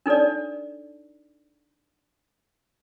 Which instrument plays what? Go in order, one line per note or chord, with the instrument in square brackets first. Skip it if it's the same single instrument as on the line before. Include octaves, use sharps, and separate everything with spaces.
[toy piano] D4 D#4 A4 C#5 D5